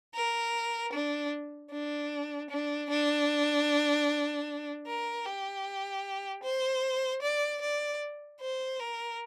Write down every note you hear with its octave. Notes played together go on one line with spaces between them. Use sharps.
A#4
D4
D4
D4
D4
A#4
G4
C5
D5
D5
C5
A#4